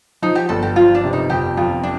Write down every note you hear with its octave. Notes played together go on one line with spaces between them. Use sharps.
F3 D#4
G4
G1 A4
G4
F3 F4
D4
C3
D#4
F2 G4
F2 F4
D4